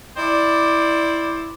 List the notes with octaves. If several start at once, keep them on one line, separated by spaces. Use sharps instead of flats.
E4 C5 D5